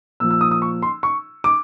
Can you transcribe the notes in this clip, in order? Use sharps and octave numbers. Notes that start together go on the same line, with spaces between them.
A#2 F3 E6
E6
D#6
D#6
C#6
C6
C#6
D6